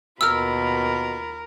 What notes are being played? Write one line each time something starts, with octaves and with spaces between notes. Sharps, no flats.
D#2 B2 F4 A#4 B5 E6 F6